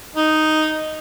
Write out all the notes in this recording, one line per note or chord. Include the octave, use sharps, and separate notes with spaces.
D#4